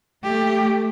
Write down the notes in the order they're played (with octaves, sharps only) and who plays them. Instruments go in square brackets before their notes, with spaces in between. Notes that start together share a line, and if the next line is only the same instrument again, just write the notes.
[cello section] A3 [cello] G4